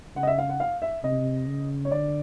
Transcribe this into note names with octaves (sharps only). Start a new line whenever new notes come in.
C#3 F#5
D#5
E5
F5
F#5
F5
E5
C3 D#5
C#3
C#5
D3 D5